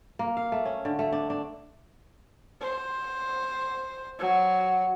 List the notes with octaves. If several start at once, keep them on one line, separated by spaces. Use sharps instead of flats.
A#3
F5
A3
C#4
D3
A3
D4
D4
C5
F#3